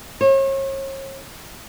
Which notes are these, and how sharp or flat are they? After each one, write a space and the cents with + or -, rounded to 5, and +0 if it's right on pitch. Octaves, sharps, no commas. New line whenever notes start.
C#5 -40